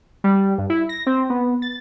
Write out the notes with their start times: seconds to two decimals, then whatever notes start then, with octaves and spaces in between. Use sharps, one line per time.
0.24 G3
0.58 G2
0.70 E4
0.89 A#6
1.06 C4
1.30 B3
1.62 A6